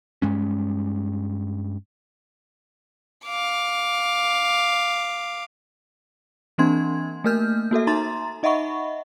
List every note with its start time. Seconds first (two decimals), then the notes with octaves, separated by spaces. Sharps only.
0.22 G2 G#3 C#4
3.25 F5 D6
6.58 E3 A#3 C4 D4 C6 G#6
7.24 A3 A#3 A#4 F6 G6
7.71 A#3 F#4 A4 E5
7.87 D#4 A#5 C6 A6
8.43 D#4 D#5 E5 F#5 B5 C#6